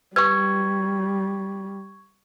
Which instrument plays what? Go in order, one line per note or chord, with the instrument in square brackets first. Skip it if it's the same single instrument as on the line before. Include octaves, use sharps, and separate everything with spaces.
[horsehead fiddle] G3 [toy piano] G4 B4 [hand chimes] C#6 G#6